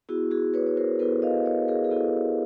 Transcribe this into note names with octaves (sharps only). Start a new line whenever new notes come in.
B3 E4 F#4 G#4
F#4 G#4
B4 C#5
C#5
A#4 C5
B3 E4 A4 B4
D#5 F5
C#5 D#5
G#4 A#4
G#4
B3 E4 G4 A4